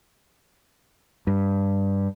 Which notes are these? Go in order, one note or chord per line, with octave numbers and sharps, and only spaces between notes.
G2